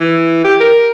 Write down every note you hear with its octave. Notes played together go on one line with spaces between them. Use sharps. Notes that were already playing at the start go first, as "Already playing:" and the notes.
E3
G4
A#4